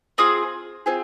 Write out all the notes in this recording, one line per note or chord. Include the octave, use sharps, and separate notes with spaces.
C4 F4 G#4 D#6
C4 F4 G#4